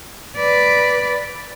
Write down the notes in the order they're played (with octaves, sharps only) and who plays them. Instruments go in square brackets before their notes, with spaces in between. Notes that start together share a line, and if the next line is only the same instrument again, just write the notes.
[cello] B4 D5